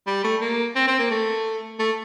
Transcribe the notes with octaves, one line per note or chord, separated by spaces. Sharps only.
G3
A3
A#3
C4
C4
A#3
A3
A3